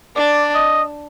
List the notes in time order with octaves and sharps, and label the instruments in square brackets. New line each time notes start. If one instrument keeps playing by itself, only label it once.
[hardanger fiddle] D4 [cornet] D5
[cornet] D#5